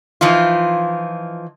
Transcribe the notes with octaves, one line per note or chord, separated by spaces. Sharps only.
E3 F3 D#4 F4